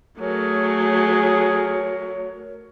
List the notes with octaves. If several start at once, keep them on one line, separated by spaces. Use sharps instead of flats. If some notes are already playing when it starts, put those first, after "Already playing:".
F#3 A3 G#4 A#4 C#5